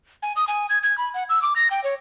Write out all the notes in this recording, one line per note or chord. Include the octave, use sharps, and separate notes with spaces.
G#5
D#6
G#5
G#6
G#6
B5
F#5
E6
D6
A#6
G5
C#5